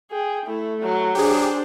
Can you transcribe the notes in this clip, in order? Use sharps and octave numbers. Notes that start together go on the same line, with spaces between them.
G#4 G5
A3 E4
F#3
D4 G4 G#4 C5